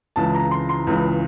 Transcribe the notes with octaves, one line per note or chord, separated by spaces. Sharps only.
C#2 C#3 E3 A5
A#5
C6
C6
C#2 C#3 E3